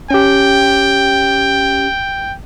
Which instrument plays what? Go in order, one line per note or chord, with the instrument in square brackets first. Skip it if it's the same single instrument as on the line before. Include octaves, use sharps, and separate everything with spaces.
[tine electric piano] C#4 G4 [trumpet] G5